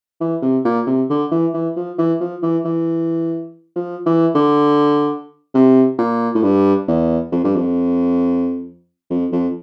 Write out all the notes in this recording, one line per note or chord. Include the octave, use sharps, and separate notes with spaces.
E3
C3
A#2
C3
D3
E3
E3
F3
E3
F3
E3
E3
F3
E3
D3
C3
A#2
A2
G2
E2
F2
G2
F2
F2
F2